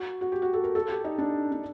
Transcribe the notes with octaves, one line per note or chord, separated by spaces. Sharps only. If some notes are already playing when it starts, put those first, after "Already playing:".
Already playing: F#4
F#4
G4
F#4
A4
A#4
A4
G4
D#4
D4
D4